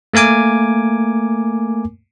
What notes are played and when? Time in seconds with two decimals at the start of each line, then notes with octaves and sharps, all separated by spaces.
0.14 A3 A#3 A#4 G#5 D6